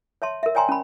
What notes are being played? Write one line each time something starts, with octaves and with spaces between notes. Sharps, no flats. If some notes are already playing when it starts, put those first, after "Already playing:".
C#5 E5 A5 C6
A#4 E5
C#5 D5 G5 G#5 A#5 C6
C#4 B5